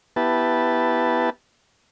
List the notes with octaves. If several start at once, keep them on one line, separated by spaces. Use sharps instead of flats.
B3 E4 G4 B4 A5